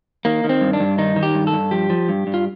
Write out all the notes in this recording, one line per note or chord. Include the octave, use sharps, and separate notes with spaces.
D#3 A#3
D#3
C4
G2
D4
G2
D#3 D#4
D#3
G4
G2
A4
G2
F3 G4
F3
G2
G2
F4